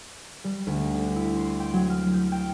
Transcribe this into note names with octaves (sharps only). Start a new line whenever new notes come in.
G3
D2
D4
E4
C6
G5
F#3
F6
G6
G5